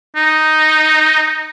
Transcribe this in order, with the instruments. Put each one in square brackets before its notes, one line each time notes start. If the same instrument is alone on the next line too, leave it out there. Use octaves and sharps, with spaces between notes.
[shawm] D#4